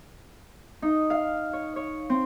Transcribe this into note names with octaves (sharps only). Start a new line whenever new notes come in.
D#4
F5
C#5
C#5
C4